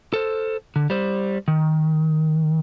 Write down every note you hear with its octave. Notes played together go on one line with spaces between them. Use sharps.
A4 C5
D3
G3 C5
D#3